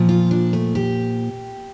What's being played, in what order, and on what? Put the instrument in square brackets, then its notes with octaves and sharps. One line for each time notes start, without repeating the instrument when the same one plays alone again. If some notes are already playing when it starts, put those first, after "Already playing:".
Already playing: [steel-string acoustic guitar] A#2 F3
F4
D4
A3
G4